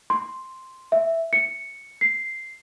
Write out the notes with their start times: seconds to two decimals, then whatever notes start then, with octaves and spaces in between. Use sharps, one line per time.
0.10 C6
0.92 E5
1.33 C#7
2.01 C7